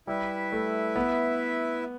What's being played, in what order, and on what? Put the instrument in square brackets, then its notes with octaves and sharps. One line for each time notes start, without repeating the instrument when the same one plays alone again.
[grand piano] G3 [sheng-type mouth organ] E4 B4 E5
[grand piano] A3
B3